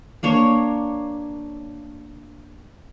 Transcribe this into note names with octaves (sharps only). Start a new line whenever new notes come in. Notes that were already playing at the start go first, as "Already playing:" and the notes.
A#3 D4 C#5